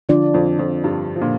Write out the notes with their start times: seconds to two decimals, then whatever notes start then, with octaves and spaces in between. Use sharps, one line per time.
0.09 D3 F3 D4 F4 D5
0.34 F2
0.59 F2
0.84 G2
1.16 F3
1.21 A#2 D3